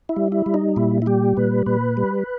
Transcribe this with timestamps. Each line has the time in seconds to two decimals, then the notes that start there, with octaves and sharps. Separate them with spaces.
0.09 E4
0.16 G3
0.32 E4
0.46 G3
0.54 D#4
0.76 A#2 E4
1.02 E4
1.06 G3 G4
1.37 A#2 B4
1.66 A#2 B4
1.97 G3